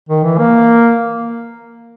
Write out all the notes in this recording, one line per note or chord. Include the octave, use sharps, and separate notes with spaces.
D#3
E3
A#3